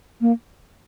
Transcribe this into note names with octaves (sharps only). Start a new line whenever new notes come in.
A#3